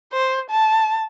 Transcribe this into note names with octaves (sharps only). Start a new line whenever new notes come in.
C5
A5